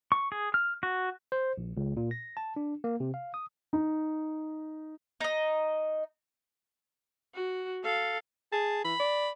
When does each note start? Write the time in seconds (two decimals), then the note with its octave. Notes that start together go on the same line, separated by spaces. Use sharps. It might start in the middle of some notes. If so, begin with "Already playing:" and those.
0.12 C#6
0.32 G#4
0.54 F6
0.83 F#4
1.32 C5
1.58 A#1
1.77 C#2
1.97 A#2
2.11 A#6
2.37 A5
2.56 D4
2.84 A#3
3.00 C3
3.14 F5
3.34 D#6
3.73 D#4
5.21 D#4 D#5
7.34 F#4
7.84 A4 F5
8.52 G#4 A5
8.85 E3 B5
9.00 D5